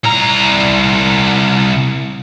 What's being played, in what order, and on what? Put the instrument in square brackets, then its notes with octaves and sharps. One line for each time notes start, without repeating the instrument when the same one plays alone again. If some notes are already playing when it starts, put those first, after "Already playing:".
[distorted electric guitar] C2 A#5